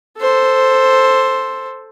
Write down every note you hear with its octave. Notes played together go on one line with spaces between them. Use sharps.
A4 C5